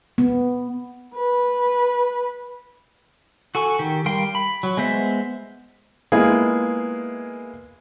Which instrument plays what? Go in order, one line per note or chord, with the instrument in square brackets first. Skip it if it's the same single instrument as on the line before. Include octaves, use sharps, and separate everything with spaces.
[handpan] B3
[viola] B4
[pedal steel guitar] F#4 A4 G#5 C#6
D#3 G4
G3 A#4 F5 G5 C6
B5
F#3
G#3 B3 C5 E5
[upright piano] G#3 A#3 B3 E4 F4 G#4